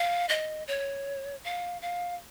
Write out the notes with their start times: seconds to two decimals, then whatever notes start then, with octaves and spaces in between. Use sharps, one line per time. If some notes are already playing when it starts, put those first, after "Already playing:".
Already playing: F5
0.29 D#5
0.68 C#5
1.44 F5
1.82 F5